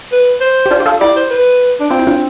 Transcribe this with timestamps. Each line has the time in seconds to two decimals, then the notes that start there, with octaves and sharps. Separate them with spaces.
0.12 B4
0.41 C5
0.66 G4
0.71 D4 F4
0.80 G4
0.86 F4 A4
1.01 E4 G4 D5
1.16 C5
1.30 B4
1.80 D4
1.90 C4 F4
1.99 E4
2.07 D4 F4